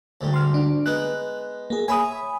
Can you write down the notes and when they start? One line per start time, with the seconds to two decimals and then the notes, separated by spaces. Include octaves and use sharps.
0.21 D2 G#2 G3
0.34 C6 F6
0.54 D4
0.86 G#3 B3 D#4 F#6
1.70 A#3 G#4
1.88 C#5 E5 G#5 B5 D#6